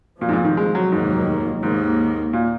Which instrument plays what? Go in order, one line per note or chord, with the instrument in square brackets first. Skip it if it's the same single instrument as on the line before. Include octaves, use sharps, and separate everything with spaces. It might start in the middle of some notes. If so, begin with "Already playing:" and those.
[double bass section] F1 F2 F3 [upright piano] A#2
[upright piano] G#2
A#2
D#3
G#3
F#3
[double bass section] F1 D#2 D#3 F#3 A#3 [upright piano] G#2
[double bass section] D#2 D#3 A#3 [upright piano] G#2
[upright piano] A#2